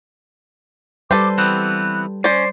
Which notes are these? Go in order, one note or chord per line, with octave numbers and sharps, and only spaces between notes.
G3 A4 B4 C5 D6
E3 B3 C4 F#6
C#4 C5 D5 C7